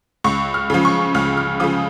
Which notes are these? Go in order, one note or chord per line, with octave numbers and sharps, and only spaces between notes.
C#2 C#6
F6
C#3 F3
C#6
C#2 F6
F6
C#3 F3 D#6